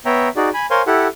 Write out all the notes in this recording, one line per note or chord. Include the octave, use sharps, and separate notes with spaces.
B3 C#5 E5 G5 A#5
D#4 F#4 G#4 D5
G#5 B5
A#4 C5 C#5 F5 G#5 C6
E4 G4 A4 F#5